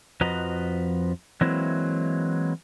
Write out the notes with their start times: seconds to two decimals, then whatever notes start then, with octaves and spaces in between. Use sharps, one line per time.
0.21 F2 F3 F#4 B4 D#5 A#5
1.41 E3 F#3 G#3 A#3 C4 E4